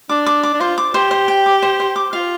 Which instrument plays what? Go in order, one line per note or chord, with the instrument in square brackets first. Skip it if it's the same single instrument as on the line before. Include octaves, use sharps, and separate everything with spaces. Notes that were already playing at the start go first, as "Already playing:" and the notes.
[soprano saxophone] D4 [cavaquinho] D6
[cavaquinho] D6
D6
[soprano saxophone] D4
[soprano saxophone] F4 [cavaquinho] C5
[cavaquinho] D6
[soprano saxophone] G4 [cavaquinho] C5
[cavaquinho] C5
G5
D6
C5
C5
D6
[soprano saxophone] F4 [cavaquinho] F5